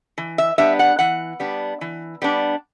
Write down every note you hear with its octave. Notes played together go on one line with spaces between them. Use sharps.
E3
E5
G3 B3 D4 E5
F#5
E3 F#5
G3 B3 D4
E3
G3 B3 D4